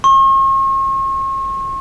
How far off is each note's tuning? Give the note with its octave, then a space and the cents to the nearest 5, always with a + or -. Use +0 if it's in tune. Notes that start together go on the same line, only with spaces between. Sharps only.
C#6 -45